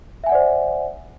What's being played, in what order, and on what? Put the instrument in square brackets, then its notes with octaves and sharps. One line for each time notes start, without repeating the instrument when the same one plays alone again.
[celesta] E5
G#5
F#5
D5
C5